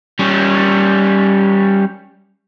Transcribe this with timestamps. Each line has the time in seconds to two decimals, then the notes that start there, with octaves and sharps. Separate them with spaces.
0.19 G3 C#4